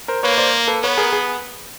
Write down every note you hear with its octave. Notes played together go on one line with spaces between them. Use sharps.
A#4 C5
A#3 B4 C#5
C5 D5
A4 B4
B3 B4 C#5
G#4 A#4
G#4